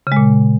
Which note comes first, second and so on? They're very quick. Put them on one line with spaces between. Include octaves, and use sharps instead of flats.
C#3 G#3 A#2